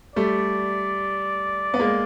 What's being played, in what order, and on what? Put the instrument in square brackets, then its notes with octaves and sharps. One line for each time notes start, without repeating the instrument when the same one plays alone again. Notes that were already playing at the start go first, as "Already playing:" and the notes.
[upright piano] G3 A3 [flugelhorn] D5
[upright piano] B3
G#3 A#3